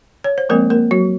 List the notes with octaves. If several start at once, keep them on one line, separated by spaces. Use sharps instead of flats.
C#5
C5
F3 G#3 A#3 C4 A#4
A#3 A#4
F#3 F#4